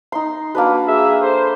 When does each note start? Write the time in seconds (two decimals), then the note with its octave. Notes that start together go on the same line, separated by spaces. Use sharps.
0.12 D#4 C6
0.55 A#3 D4 F#4 B4
0.88 G#4 E5
1.22 A4 C5